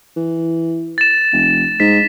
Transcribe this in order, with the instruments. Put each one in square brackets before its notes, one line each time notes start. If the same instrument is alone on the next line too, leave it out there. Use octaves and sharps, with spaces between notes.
[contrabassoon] E3
[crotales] A6 E7
[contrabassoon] F1
[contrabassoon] G#2 [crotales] B6